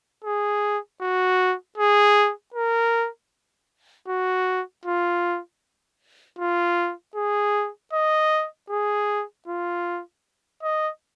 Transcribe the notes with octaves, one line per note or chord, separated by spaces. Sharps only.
G#4
F#4
G#4
A#4
F#4
F4
F4
G#4
D#5
G#4
F4
D#5